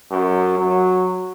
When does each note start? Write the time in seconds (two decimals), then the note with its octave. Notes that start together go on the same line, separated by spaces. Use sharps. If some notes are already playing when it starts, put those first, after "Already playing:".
0.11 F#2
0.59 F#3